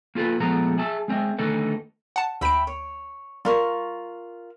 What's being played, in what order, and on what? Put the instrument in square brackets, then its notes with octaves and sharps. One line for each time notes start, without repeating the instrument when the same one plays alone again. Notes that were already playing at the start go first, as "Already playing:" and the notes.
[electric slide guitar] A#3 F4 G4 A4 B4
A#2 F3 G#3 A3 B3 A#5
G#4 E5 A5
G#3 C4 A#4 D#5 E5
D3 D#3 A3 D#4 A4 B4
[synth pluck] F#5 A5
[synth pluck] D2 D7 [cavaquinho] E5 G5 B5
[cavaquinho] C#5
[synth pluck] G3 [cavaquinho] F4 A#4 C#6